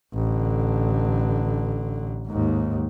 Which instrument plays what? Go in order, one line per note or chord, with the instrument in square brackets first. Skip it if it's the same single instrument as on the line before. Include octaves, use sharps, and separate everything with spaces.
[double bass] A1 D3
D#2 G#2